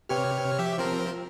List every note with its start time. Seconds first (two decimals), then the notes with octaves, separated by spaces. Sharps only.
0.09 C3 G4 B4 C#5 G5 F6
0.59 F3 G4 E5
0.78 F3 C4 F4 A#4